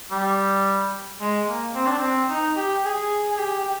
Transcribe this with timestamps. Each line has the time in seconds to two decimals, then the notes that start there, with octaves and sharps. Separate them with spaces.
0.11 G3
1.21 G#3
1.48 A#3
1.75 C4
1.86 D4
1.99 C4
2.29 D#4
2.56 G4
2.84 G#4
3.30 G#4
3.38 G4
3.59 G4